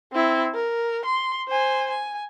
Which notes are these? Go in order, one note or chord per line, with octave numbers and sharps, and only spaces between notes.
C4 E4
A#4
C6
C5 G#5
G#5